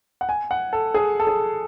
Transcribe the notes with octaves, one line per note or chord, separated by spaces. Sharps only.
F#5
G#5
F#5
A4
G#4
A4
G#4